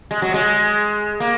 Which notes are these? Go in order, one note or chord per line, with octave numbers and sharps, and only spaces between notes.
G#3
F#3
G#3
A#3